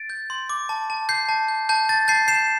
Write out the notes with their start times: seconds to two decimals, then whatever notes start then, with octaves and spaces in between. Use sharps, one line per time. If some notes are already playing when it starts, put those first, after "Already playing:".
Already playing: A6 D7
0.10 G6
0.30 C6
0.49 D6
0.69 A5
0.90 A5
1.09 G6 C7
1.29 A5
1.48 G6
1.69 A5 G6
1.89 A5 A6
2.08 A5 G6 C7
2.28 G6 C7 E7